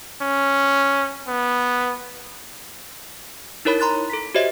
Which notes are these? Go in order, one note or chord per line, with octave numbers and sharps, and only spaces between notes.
C#4
B3
D#4 E4 A#4 C#5 B5
A#5 C6 F#6 A6
A4 B6
F#4 G4 C5 C#5 D#5 E5